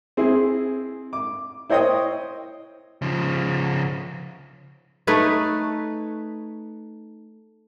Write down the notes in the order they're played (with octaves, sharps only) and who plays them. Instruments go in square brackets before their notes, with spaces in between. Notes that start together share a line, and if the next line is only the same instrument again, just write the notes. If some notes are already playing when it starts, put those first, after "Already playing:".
[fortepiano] C4 E4 G#4
D6
E4 C5 C#5 D#5 G5 D#6
[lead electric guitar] C#3 F3
[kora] A3 D#4 B4 C#5